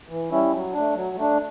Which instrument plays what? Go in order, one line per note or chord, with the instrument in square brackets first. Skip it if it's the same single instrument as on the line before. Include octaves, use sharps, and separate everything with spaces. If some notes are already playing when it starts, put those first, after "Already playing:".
[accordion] E3
G3 C#4 E4
F#3
D4
A3
F#3
A3 D4